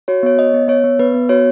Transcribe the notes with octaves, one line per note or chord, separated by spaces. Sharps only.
F#4 C#5
B3 C#5
B3 D#5
B3
B3 C#5
B3
B3 B4
B3
F#4 C#5